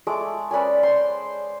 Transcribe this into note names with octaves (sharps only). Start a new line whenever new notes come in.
G#3 A3 D6
C#4 B4 D5 G#5
C5 C6